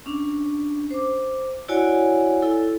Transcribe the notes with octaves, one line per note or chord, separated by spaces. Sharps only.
C#4 D4
C5 D6
E4 F#4 C#5 D5 F#5 G#5
E4 A4